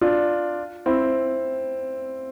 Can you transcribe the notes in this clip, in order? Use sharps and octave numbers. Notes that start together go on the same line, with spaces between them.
D4 F4
C4 E4